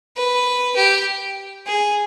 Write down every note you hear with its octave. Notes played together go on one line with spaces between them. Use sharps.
B4
G4
G#4